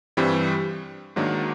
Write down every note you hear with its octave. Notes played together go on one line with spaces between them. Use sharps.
G2 E3 G3 C4
G#2 D#3 F#3 A#3 D4